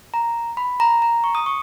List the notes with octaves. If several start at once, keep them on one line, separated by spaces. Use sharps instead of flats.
A#5
B5
A#5
A#5
C#6
D#6
C#6